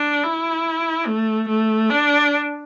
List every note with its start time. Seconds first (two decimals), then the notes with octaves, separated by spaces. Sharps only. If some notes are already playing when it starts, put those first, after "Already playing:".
Already playing: D4
0.23 E4
1.07 A3
1.49 A3
1.90 D4